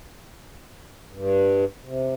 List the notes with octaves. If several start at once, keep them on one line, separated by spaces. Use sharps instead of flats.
G2
C3